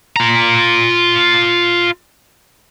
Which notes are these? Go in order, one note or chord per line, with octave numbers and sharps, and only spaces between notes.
F4 A#5